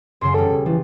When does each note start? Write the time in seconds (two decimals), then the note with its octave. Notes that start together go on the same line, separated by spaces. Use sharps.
0.21 F#2 C#3 F#3 C6
0.34 E1 G3 A4
0.66 E3 F3